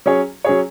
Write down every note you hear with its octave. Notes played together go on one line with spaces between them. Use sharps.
F#3 C#4 G#4 C#5
F#3 C#4 G#4 C#5